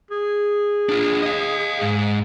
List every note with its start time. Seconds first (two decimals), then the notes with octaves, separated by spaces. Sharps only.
0.11 G#4
0.89 D4 F4
1.22 D#5 F5
1.81 G#2